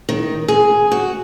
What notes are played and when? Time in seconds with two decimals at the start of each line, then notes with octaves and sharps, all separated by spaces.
0.09 D#3
0.48 G#4
0.92 F#4